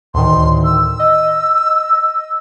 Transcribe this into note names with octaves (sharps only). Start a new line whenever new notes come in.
D2 A2 D#3 C6
E6
D#5